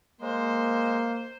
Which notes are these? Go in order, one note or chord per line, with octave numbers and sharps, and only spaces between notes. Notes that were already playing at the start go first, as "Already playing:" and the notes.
G#3 A#3 C5